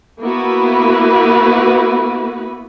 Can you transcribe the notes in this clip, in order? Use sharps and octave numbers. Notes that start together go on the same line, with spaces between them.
A#3 B3 E4 F#4 B4